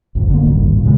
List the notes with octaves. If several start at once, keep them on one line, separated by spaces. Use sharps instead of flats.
G#1 F2 D3
D3 A#3
G#1 D2 G2 D#3
D#2 A#2
A#2 C#3 E3 G#3